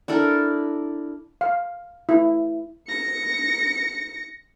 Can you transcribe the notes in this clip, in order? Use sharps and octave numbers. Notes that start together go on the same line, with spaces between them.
D4 E4 A4 A#4
F5
E4
A#6 C#7